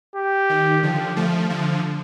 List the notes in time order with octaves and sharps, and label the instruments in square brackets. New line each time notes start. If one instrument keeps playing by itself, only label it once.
[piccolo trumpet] G4
[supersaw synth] D#3
D3 F3
F3 A3
D3 F3